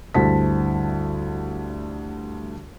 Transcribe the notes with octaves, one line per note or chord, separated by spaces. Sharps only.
D2 G2 E4 C5 A5 B6